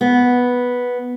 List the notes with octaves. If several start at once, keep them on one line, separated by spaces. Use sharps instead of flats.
B3